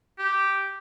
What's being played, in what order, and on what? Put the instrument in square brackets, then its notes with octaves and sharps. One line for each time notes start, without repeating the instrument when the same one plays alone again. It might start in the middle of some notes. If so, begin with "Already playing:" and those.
[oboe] G4